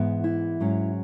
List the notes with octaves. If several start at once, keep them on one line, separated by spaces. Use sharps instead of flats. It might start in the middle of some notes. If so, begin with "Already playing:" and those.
Already playing: G#2 E3 B3
E4
G#2 F#3 C#4